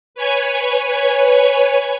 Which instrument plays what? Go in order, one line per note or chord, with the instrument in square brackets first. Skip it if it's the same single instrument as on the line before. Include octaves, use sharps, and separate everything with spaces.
[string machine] B4 C#5 G#5